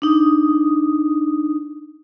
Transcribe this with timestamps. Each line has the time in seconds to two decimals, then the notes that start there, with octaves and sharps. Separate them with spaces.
0.02 D4 D#4 D#6